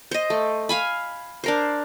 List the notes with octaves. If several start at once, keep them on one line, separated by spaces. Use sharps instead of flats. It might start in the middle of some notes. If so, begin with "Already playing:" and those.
C5 D#5
A3
F5 G#5 B5
D4 A#4 C5